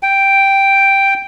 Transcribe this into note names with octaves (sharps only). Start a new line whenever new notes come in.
G5